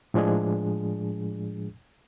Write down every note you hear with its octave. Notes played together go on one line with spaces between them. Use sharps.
A2 F3 G#3 D4 G#4